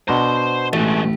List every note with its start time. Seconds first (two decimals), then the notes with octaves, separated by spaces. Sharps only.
0.08 B2 D4 C5 A#5 C6
0.73 A1 G#3 A3